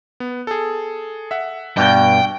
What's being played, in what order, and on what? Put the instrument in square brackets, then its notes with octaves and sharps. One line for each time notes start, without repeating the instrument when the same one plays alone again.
[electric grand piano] B3
G#4 A4
E5 F#5
[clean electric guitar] G2 B2 [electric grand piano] D5 [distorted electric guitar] G5